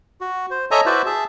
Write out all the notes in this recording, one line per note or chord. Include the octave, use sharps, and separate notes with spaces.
F#4
C5
A4 C#5 D#5 E5 G#5 A#5
E4 F#4 B4 C5 D5 E5
G#4 E5 A5